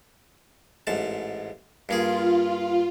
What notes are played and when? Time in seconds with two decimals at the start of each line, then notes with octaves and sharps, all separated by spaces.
0.87 A1 G#2 A5
1.89 G2 A#3 F4 G#4